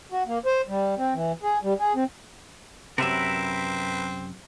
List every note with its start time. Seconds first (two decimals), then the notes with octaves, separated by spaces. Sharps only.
0.12 F#4
0.27 A#3
0.46 C5
0.69 G3
0.98 C4
1.14 E3
1.43 G#4
1.63 G3
1.80 G#4
1.95 C4
2.98 F#2 C3 C4 A#4 B4 E5